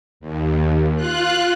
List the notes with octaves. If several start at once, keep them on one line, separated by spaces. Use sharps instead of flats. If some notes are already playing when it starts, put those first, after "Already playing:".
D#2
F4 F#6